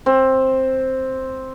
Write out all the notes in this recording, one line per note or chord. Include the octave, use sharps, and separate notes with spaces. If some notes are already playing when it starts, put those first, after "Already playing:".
C4